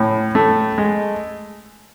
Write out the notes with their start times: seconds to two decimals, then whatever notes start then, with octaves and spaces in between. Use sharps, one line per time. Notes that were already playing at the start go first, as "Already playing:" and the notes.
Already playing: A2 C#4
0.35 A3
0.78 G#3